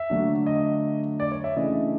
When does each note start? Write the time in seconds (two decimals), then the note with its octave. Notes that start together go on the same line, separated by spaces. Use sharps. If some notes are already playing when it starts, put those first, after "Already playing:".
Already playing: E5
0.10 D3 F#3 A3 D4
0.46 D#5
1.20 D5
1.32 C#5
1.44 E5
1.56 C#3 E3 A3 D4 D#5